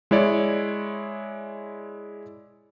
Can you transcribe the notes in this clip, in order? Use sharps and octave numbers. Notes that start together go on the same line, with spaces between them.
G#3 E4 C#5 D5